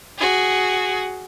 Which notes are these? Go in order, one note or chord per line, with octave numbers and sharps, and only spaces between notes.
F#4 G#4